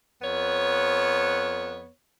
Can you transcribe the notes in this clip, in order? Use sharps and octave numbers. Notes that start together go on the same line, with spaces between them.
F2 B3 C#5